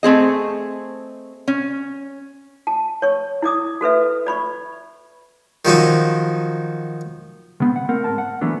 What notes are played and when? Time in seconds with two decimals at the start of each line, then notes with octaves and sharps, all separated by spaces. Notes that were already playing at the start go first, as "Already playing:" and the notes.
0.03 A3 C4 G#4 D#5
1.48 C#4
2.67 A5
3.02 C#5 C#6
3.42 E4 D5 D6 D#6
3.81 F#4 A4 B4 E5
4.26 D5 B5 C#6
5.65 D#3 F3 F#3 D#4
7.60 C#2 B3 C4
7.76 F#5
7.89 A3 C4 A#4 F#5
8.04 G#2 G#3 A#4 A5
8.18 F#5
8.41 E3 F#3 A3 B3 D4